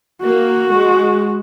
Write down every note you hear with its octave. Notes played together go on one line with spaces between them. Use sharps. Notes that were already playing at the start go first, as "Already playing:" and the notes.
A#3 F#4
G#3